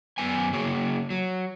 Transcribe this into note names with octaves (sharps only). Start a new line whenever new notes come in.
F#2 B3 G#5
C#3 F#3 A#3 G#4
F#3